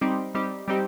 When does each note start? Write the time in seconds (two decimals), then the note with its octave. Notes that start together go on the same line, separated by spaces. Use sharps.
0.01 G3 C4 D#4 G4
0.35 G3 C4 D#4 G4
0.68 G3 C4 D#4 G4